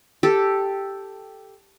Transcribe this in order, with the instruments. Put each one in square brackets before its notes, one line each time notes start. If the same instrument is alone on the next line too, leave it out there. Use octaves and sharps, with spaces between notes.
[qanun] G4 A4